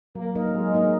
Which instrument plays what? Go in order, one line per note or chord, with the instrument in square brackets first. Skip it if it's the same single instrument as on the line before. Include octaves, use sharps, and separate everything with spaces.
[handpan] F#3 [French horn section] A#3
[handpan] A#3 D#4 A#4 D#5
[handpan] F#3 [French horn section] G#3
[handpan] A#3 D#4 A#4 D#5